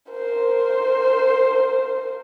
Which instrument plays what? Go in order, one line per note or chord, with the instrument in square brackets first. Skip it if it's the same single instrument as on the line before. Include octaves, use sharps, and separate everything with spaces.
[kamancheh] A#4 C5